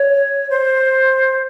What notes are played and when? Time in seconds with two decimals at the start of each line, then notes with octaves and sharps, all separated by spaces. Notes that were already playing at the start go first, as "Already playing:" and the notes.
Already playing: C#5
0.50 C5